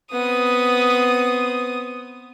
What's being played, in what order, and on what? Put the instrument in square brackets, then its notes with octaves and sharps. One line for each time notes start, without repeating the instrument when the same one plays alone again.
[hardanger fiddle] B3 C4 [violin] D#6